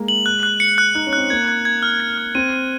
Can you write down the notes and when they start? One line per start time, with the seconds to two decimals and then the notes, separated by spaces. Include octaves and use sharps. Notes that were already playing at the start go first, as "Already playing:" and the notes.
Already playing: G#3 A#3
0.08 F#7
0.26 F#6
0.43 F#6
0.60 C#7
0.78 F#6
0.95 D#4 F#6
1.07 C#4
1.13 C4 F#6
1.30 A#3 G#6
1.48 G#6
1.65 G#6
1.83 F6
2.00 G#6
2.18 F6
2.35 C4 D#7
2.53 D#7